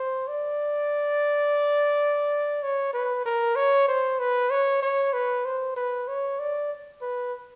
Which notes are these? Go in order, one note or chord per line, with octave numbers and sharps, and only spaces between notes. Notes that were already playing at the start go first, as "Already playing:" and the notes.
Already playing: C5
D5
C#5
B4
A#4
C#5
C5
B4
C#5
C#5
B4
C5
B4
C#5
D5
B4